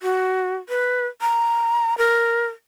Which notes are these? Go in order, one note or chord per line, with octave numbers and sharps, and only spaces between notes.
F#4
B4
A#5
A#4